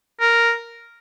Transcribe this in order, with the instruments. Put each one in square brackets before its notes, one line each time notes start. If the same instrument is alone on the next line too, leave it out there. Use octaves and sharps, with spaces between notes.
[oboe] A#4